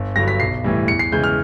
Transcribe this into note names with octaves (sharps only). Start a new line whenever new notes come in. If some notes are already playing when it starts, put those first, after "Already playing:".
Already playing: G1
G2 D3 F#3 A#6
B6
B1 C7
A2 E3 G3
E2 C#7
C7
C#3 E3 G#3 G6
F6